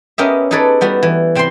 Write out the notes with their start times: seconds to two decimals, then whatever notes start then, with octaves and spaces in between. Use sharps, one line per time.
0.18 B3 C#4 G4 A#4 D#5 E5
0.51 D#4 G#4 A4 B4 C#5 D5
0.81 G3 B3 F#4
1.03 E3
1.35 C3 C4 G5 B5 C6